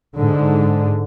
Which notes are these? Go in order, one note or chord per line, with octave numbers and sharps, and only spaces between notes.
G#2 D3